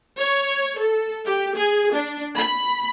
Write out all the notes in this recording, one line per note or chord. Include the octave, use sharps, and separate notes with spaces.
C#5
A4
G4
G#4
D4
B5